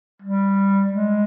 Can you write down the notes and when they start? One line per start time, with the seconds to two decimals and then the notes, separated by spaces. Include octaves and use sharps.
0.22 G3
0.93 G#3